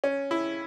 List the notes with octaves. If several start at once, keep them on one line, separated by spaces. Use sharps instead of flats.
C#4
E4